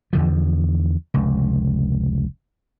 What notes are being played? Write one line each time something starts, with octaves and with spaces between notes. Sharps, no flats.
E2 D3 F3
F1 C#2